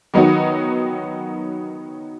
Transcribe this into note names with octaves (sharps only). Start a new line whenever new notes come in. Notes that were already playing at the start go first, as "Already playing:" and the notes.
D#3 F#3 B3 D#4 F#4